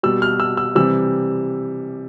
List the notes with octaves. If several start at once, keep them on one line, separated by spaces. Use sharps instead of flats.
B2 G3 E6
F6
E6
E6
C3 E3 G3 E6